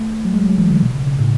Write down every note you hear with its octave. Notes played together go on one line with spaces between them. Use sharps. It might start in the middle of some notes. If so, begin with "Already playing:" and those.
Already playing: A3
F#3
G#3
F#3
E3
D3
B2
C#3
C#3
A2